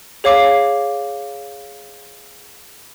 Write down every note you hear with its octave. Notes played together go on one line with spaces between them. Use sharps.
G#4 C#5 F5 D6 C7